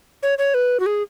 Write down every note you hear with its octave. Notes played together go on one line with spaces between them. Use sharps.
C#5
C#5
B4
F#4
G#4